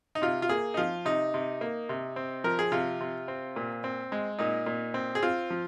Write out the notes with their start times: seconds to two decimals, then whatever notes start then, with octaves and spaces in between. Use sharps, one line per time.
0.15 D#4
0.22 C3 F4
0.42 F4
0.49 A#3 G#4
0.74 D#4
0.77 F3 F4
1.05 C3 D#4
1.34 C3
1.61 A#3
1.89 C3
2.16 C4
2.44 F3 A#4
2.59 G#4
2.72 C3 F4
3.00 C3
3.28 C4
3.56 A#2
3.84 C4
4.12 G#3
4.39 A#2 D#4
4.66 A#2
4.94 C4
5.15 G#4
5.23 C4 F4
5.50 F3